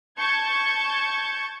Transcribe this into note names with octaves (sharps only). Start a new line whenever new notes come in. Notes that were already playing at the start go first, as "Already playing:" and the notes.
A5 C#6 G6 G#6